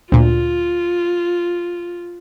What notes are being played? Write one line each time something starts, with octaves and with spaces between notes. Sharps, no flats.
D2 A#2 F4